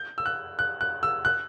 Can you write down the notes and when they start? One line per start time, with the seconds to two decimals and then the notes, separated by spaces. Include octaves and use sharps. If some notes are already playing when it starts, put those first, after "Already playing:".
Already playing: G6
0.18 E6
0.26 F#6
0.59 F#6
0.81 F#6
1.03 E6
1.25 F#6